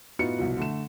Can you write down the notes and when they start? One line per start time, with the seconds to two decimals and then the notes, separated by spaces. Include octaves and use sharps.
0.19 A2 B3 D#4 F4 F#4 C#7
0.38 C2 B2 F3 F#3
0.57 D3 A3 E7